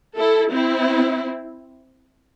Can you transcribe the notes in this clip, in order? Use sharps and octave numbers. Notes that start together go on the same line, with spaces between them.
E4 A4
C4 E4